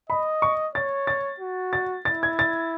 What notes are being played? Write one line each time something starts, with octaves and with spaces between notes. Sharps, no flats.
D#5 B5
C#6
C#5 A6
A6
F#4
A6
E4 A6
G#6
A6